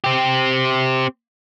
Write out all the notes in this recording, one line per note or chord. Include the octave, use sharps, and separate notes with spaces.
C4 G4